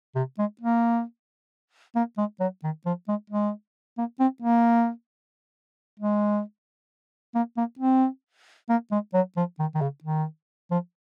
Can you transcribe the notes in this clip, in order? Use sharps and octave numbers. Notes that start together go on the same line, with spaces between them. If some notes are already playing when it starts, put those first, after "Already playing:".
C3
G#3
A#3
A#3
G#3
F#3
D#3
F3
G#3
G#3
A#3
C4
A#3
G#3
A#3
A#3
C4
A#3
G#3
F#3
F3
D#3
D#3
C#3
D#3
F3